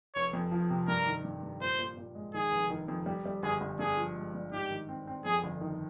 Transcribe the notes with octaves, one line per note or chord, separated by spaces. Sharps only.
F1 C#5
F2
F3
C3
G2 A#4
D#3
G2
G2
A#2 C5
A#2
A#2
G#3
D#3 G#4
F1
D#3
F2
G3
G3
G1 G#4
G1
G2 G#4
F3
G#3
G2
G#2 G4
D#3
C4
C4
F2 G#4
G1
D#3